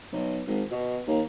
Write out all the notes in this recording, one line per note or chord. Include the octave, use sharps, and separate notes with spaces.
B1
G#1
B2
D#2